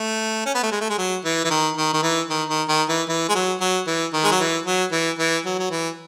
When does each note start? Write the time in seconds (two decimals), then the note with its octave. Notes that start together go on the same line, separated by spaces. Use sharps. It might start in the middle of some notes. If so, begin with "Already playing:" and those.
Already playing: A3
0.46 C#4
0.55 B3
0.63 A3
0.72 G#3
0.81 A3
0.90 G#3
0.98 F#3
1.25 E3
1.45 E3
1.50 D#3
1.77 D#3
1.93 D#3
2.03 E3
2.30 D#3
2.49 D#3
2.69 D#3
2.89 E3
3.09 E3
3.29 G#3
3.35 F#3
3.61 F#3
3.87 E3
4.13 D#3
4.24 G#3
4.32 F#3
4.40 E3
4.66 F#3
4.92 E3
5.19 E3
5.45 F#3
5.59 F#3
5.71 E3